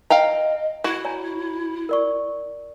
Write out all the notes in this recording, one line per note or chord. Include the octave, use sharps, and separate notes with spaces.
D#5 F5 G5 A#5
E4 F#4
C#5 G#5 A#5
A#4 D5 C#6